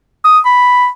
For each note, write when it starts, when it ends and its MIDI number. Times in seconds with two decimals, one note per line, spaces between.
0.25 0.39 87
0.45 0.87 83